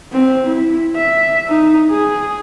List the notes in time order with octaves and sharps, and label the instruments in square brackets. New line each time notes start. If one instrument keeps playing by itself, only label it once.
[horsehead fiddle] C4
E4
E5
D#4
G#4